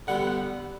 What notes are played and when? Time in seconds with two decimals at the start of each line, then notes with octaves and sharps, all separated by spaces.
0.07 D3 G3 B3 F#5
0.27 F#5